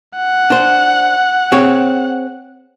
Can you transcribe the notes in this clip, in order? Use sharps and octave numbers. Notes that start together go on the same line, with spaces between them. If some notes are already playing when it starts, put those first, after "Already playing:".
F#5
D4 C5
C4 G#4 C#5